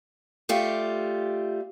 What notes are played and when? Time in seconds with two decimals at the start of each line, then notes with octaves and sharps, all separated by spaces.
0.49 G3 A3 F4 G4